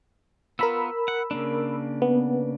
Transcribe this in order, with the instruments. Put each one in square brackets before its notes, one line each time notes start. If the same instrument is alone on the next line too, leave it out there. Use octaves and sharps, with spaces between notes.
[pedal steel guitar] B3 F4 [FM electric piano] A#4 B5 E6
[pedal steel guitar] F#5
C#3 A#3 D4
[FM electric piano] B3